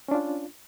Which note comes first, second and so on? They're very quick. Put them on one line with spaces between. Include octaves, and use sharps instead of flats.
C#4 D4 F4